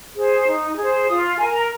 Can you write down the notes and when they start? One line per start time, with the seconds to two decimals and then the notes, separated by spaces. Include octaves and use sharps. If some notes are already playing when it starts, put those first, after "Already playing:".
0.15 G#4 C5
0.47 D#4
0.77 G#4 C5
1.08 F4 D#6
1.39 A#4 G#5
1.54 A#5